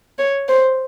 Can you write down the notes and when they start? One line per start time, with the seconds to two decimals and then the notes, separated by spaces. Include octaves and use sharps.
0.19 C#5
0.48 C5